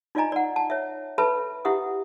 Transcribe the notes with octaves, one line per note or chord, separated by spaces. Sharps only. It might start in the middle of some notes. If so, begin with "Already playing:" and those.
D#4 F4 D5 D#5 G#5 A#5
D5 F#5
A5
C#5 E5
A4 B4 E5 A5 B5
E4 G4 E5 F#5 D#6